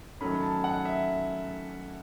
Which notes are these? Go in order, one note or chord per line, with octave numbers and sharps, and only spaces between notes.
D#3 F#3 A3 C#4 B5
A5
F#5
E5